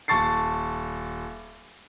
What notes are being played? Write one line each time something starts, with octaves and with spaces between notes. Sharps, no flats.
D#1 A5 C#6 A6 C7